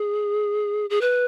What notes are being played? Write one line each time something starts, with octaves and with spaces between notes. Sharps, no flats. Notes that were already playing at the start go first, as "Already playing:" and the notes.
Already playing: G#4
G#4
B4